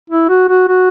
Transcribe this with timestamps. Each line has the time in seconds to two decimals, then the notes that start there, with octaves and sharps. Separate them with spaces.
0.10 E4
0.29 F#4
0.49 F#4
0.68 F#4